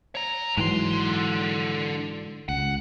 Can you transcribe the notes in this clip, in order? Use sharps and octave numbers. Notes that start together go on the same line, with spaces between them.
C#5 A#5
G#2 D3 E3 F#3 C6
C#2 F#5